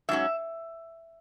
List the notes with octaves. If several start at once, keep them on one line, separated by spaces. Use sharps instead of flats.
G#2 F#3 C#4 E5